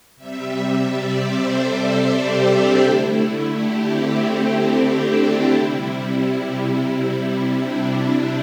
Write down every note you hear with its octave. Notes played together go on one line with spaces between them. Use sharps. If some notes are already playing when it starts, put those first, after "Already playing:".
C3 G3 E5
E5
D5
C5
A4
G4
D4
D3 A3 E4
G4
C4
C4
D4
C3 G3 E4
D4